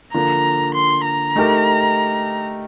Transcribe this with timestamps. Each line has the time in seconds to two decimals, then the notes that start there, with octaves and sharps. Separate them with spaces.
0.14 D3 F3 A#3 A#5
0.75 C6
1.06 A#5
1.36 A3 D#4 G4 A#4